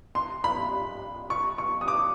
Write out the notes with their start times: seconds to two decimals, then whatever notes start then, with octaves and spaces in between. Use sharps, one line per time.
0.15 C6
0.44 B5
1.30 C#6
1.58 C#6
1.81 D#6
1.88 D6